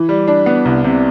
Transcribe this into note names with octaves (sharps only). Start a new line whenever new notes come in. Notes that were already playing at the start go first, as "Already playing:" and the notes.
Already playing: E3
G3
D4
B3
C2
C3